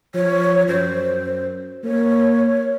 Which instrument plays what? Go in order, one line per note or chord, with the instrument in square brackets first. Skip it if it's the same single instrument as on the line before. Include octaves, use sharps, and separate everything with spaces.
[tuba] F3 [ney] C#5
[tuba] F#2 [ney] C5
[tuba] A#3 [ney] C#5